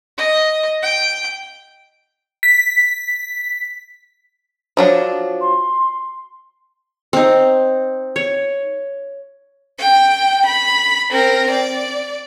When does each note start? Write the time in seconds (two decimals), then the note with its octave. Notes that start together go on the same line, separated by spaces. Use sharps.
0.18 D#5
0.82 G5
2.43 B6
4.77 F3 F#3 D4
5.41 C6
7.13 C4 D#4
8.16 C#5
9.79 G5
10.47 B5
11.11 C4 A#4
11.51 D5